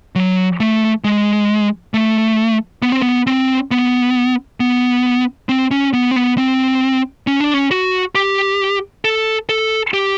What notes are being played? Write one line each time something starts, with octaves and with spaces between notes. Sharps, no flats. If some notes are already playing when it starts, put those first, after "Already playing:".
F#3
A3
G#3
A3
B3
C4
B3
C4
B3
B3
C4
C#4
B3
C4
B3
C4
C#4
D4
C#4
F#4
G4
A4
A4
G4